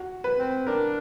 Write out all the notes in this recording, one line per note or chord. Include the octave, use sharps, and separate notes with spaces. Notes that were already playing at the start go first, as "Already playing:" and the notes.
Already playing: F#4
B4
C4
D4 A#4